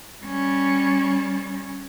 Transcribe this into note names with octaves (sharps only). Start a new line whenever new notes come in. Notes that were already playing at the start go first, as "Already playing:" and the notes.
G3 C#4